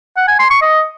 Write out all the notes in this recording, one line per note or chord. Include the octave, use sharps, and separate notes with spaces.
F#5
G#5
C6
C#6
D#5